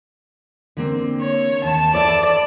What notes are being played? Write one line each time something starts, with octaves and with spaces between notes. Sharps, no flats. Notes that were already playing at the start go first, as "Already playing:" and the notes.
D3 A#3 C4
C#5
D#2 A5
A4 B4 D5 E5